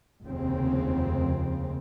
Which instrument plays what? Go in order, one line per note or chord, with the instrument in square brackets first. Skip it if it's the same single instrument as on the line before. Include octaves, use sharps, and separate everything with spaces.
[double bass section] F1 D#2 C#3 F3 C4